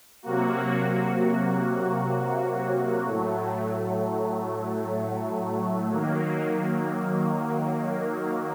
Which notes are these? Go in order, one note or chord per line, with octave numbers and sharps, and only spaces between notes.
C3 F#3 A#3 F#4
A2 F#3 A3
D#3 F#3 A#3